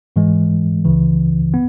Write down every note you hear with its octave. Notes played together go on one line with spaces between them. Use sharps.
G#2 E3 G#3
C#2 C#3 E3
B3